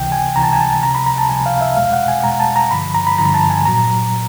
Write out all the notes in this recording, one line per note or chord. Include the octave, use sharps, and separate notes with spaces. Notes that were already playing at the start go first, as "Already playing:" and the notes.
Already playing: C#2 C3 E3 G5
G#5
C#2 C3 E3 A#5
A5
G#5
A5
C#2 C3 F3 A#5
B5
A#5
A5
C#2 C3 F3 G#5
F5
E5
E2 B2 G#3 F5
F#5
G#5
E2 B2 G#3 A#5
A5
A#5
G2 D3 F3 B5
A#5
B5
G2 D3 F3 A#5
A5
G#5
A#2 F#3 A#5